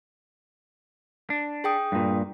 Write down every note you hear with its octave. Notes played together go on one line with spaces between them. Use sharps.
D4
G#4 G5 D#6
G2 A#2